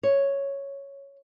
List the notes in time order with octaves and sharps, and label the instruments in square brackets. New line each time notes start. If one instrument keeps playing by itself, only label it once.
[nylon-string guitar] C#5